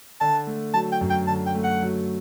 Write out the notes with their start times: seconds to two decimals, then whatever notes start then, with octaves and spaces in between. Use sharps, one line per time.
0.21 D3 A5
0.47 A3
0.74 F#3 A5
0.92 G5
1.01 F#2
1.10 G5
1.28 D3 A5
1.46 G5
1.55 A3
1.64 F#5
1.82 F#3